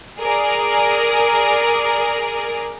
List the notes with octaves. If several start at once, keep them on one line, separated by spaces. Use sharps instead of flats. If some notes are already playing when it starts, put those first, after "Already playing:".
G#4 A#4 D5